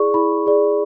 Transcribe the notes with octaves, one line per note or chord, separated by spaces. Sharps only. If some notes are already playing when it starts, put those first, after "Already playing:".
Already playing: E4 G#4 D5 C#6
E4 B5
G#4 D5